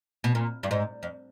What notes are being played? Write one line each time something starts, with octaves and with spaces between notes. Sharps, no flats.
B2
A#2
G2
G#2
F2